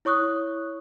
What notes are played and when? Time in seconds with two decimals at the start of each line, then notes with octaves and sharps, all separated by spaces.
0.05 E4 C#5 C#6 D#6 F#6